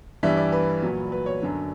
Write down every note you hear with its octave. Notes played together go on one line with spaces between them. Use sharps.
G2 E3 G3 E5
D5
B4
A#2 F#3
B4
C#5
F#2 D3 F#3